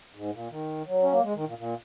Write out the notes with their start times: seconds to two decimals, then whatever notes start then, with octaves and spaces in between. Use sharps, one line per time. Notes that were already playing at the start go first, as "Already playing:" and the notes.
0.15 G#2
0.32 A#2
0.50 D#3
0.87 F#3
1.02 C#4
1.12 A#3
1.23 G#3
1.34 D#3
1.46 A#2
1.58 A#2